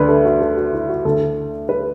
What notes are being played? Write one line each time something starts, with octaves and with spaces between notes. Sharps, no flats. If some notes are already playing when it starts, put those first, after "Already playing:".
Already playing: D2 D3 B4 D5
A4
F#4
A4
F#4
E4
F#4
D2 D3 A4
B4